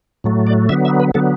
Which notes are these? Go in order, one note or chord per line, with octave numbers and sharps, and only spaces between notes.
A2 F#3 A3
D5
D3 F#3 B3 E5
E5
B4
D3 F#3 B3 A4